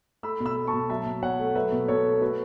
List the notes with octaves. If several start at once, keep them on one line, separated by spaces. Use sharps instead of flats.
A3 B5 E6
B2
B5 E6
A3
A5 C#6
B2
F#3 E5 A5
B2
B2 C#5 F#5
A3
F#3 B4 E5
B2
B2 A4 C#5
A3
A3 F#4 B4